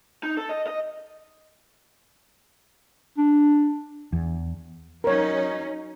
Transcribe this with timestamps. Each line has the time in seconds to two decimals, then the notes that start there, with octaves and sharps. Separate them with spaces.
0.23 D#4
0.37 A4
0.49 D#5
0.67 D#5
3.18 D4
4.13 E2
5.04 F#3 C#4 D#4 A#4 C#5